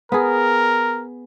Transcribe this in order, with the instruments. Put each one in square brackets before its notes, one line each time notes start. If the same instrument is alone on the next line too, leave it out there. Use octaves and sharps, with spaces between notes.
[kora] B3 G#4 [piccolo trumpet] A#4